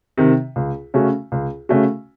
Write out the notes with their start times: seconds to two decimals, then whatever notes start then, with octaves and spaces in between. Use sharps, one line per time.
0.17 C3 D#3
0.56 C#2
0.94 C#3 A3 C#4 F#4
1.32 C#2
1.69 C#3 A3 C#4 F#4